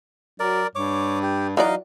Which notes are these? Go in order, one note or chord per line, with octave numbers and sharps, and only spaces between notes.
F#3 A#4 D5
G2 C#5 D6
G4
E3 F#3 D#4 F#4 D5 D#5 F5